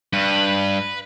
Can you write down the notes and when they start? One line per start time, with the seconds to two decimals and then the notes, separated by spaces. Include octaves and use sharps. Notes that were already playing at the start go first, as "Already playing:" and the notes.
0.13 G2 B4